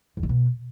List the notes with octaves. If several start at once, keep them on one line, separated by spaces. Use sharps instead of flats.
E2
D3
B2